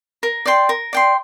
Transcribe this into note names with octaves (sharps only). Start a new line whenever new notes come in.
A#4
D5 G5 C6
A#4
D5 G5 C6